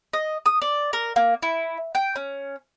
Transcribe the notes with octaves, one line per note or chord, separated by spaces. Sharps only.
D#5
D#6
D5
A#4
A#3
E4
G5
C#4